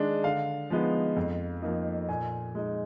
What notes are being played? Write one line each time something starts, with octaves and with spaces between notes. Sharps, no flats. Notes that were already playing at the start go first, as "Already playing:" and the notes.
Already playing: D#3 G#3 D4
D3 F5
F3 G#3 B3 D#4
F2
F3 A#3 D#4
A#2 G#5
G#3 D#4